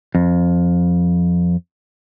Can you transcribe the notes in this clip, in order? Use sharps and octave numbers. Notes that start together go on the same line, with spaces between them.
F2